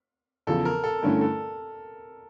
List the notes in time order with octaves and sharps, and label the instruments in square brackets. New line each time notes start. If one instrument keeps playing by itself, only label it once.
[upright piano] E2 C#3 F3 [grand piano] A4
[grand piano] A#4
A4
[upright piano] G2 D3 A3 C#4 E4
[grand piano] A4